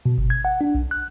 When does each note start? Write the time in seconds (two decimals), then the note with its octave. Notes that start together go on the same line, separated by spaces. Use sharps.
0.06 B2
0.18 G1
0.30 G#6
0.45 F#5
0.61 D4
0.75 B1
0.91 F#6